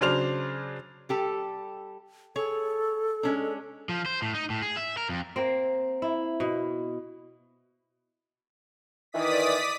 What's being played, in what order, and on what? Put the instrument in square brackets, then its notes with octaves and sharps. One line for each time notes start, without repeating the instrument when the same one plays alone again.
[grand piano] C#3 F#3 D4 C5 F6 F7
[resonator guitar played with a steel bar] G3 G4 A4
[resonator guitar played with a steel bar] G#4 C#5 [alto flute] A4
[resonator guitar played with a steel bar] G#3 C#4 D4
[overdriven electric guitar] F3
C5
A2
D#4
A2
G#4
E5
A#4
F2
[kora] A#3 C4
E4
B2
[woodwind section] D#3 E3 [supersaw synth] D5 D#6 B6